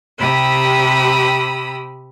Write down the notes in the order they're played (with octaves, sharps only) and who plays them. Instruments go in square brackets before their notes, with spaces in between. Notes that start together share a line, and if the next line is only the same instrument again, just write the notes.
[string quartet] C3 G4 B5 D#6 E6